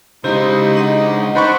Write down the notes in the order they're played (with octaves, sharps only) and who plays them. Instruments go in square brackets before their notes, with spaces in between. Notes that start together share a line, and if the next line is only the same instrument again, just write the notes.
[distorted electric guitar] C#3 G#3 [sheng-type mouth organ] D#4 [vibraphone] E4 G4 [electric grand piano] C5
[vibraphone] D4 D#5 F#5
[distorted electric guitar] D4 [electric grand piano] D#4 B5 C#6 [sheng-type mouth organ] B4 C5 F#5